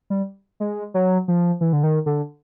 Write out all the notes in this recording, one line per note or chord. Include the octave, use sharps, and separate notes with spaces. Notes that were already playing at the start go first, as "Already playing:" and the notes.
G3
G#3
F#3
F3
E3
D3
D#3
D3